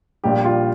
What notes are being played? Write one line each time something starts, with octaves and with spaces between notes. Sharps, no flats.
A#1 A#2 G3 G4
F4